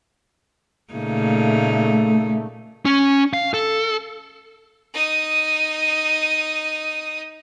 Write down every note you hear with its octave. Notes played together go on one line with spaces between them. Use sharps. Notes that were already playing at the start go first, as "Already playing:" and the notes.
A#2 C#3 A3 D#4
C#4
F5
A4
D#4 D#6